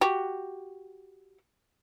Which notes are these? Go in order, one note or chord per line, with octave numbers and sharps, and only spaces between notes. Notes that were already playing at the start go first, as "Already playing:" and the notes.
F#4 G4